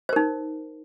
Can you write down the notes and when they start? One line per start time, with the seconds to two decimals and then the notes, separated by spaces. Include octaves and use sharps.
0.09 C5
0.13 A#4
0.16 D#4